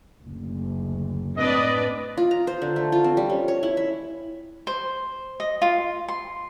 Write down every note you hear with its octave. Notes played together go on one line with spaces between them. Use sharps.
F#1 D2
A2 C4 D4 B4 D5 D#5
F4
A#5
C5
D3
A3
F4
C4
G3
C#4
C#5
E4
E5
C5
D#5
F4
C6